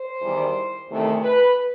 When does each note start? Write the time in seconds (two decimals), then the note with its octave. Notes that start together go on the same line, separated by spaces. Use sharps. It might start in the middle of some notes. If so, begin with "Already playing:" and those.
Already playing: C5
0.21 E2 D#3 G3
0.89 E2 C3 D#3 A3
1.22 B4